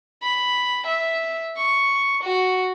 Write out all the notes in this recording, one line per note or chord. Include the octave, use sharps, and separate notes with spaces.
B5
E5
C#6
F#4